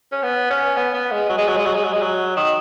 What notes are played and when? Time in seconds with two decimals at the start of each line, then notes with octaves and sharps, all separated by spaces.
0.12 C#4
0.23 B3
0.50 C#4
0.77 B3
0.94 B3
1.12 G#3
1.29 F#3
1.38 G#3
1.47 F#3
1.57 G#3
1.65 F#3
1.74 G#3
1.84 F#3
1.92 G#3
2.01 F#3
2.37 D#3